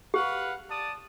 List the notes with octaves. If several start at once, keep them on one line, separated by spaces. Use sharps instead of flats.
G4 B4 F5 F#5
D5 A5 D#6